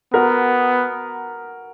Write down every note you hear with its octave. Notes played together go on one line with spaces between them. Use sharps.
B3 F#4 A#4